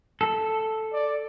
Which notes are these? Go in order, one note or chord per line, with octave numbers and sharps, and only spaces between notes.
A4
D5